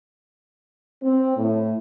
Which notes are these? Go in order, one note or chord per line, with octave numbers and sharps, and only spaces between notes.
C4
A2